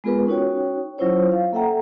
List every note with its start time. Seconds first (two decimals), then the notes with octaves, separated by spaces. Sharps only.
0.04 G#3 B3 F4 G#4 A#4 B4
0.27 C#4 D#4 F#4 C#5 G5
0.98 F#3 C#4 E4 F4 C5 C#5
1.32 F5
1.53 A#3 A4 E5 F#5 G5 A#5